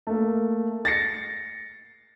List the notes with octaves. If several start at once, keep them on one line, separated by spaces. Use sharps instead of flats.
A3 A#3
A6 A#6 C7 C#7